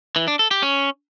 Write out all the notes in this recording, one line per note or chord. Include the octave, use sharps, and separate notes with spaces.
E3
D4
A4
G4
C#4